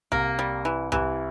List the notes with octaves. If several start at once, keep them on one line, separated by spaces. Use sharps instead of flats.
C2 C3 A#3
G3
E3
C2 C3 E3